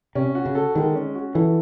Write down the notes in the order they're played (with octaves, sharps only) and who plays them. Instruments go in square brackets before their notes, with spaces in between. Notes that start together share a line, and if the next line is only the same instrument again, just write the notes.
[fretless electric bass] C3 [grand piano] C#4
[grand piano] F#4
[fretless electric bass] C#3
[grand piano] A4
[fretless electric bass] D#3 [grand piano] G#3
[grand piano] C#4
F#4
[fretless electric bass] E3 [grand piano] A4